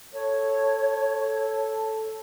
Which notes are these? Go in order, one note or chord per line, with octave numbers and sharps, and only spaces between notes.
A4 C#5